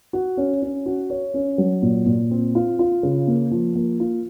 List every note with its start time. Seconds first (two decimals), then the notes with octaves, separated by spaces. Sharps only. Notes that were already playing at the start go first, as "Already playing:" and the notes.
0.13 F#4
0.37 C#4
0.62 C#4
0.86 F#4
1.10 C#5
1.34 C#4
1.58 F#3
1.82 A#2
2.06 A#2
2.31 C4
2.55 F4
2.79 F4
3.03 C#3
3.27 A#3
3.51 F3
3.75 A#3
4.00 F4